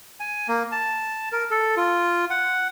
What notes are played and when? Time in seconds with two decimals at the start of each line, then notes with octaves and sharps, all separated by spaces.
0.20 G#5
0.48 A#3
0.72 A5
1.32 A#4
1.51 A4
1.77 F4
2.30 F#5